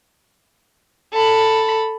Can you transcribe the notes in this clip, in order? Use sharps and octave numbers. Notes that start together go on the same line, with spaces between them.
A4 B5